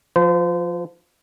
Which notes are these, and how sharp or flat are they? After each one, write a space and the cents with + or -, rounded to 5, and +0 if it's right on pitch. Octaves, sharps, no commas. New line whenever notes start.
F3 +15 C5 -35